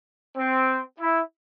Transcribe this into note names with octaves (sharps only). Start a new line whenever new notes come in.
C4
E4